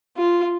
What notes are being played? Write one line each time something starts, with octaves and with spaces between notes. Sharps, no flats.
F4